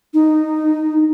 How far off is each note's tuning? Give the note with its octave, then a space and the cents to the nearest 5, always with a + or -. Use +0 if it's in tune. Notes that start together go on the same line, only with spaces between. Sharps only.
D#4 -10